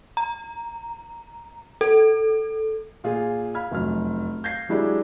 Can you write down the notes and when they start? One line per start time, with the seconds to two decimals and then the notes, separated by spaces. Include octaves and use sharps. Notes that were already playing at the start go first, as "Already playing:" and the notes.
0.17 A#5
1.81 A4
3.04 A#2 F4 G#4
3.55 F5 B5 F6 G#6
3.71 F1 F#2 F6
4.44 F5 G6 G#6 A#6 C7
4.69 F#3 G#3 D4 E4 G4 G#4